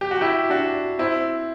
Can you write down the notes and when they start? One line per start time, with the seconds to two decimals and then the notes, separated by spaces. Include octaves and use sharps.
0.01 G4
0.11 F#4
0.21 E4 G4
0.50 D4 F#4
0.99 C4 E4